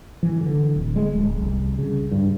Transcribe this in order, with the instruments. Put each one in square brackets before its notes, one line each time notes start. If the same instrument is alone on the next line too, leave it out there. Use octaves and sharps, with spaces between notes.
[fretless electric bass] E3
D3
D1
G#3
D1
C2
C#3
G2